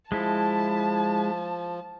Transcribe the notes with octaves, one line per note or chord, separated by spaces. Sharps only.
F3 G#3 E4 A5